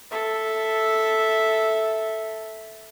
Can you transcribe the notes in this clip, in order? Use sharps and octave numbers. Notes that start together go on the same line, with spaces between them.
A4 E5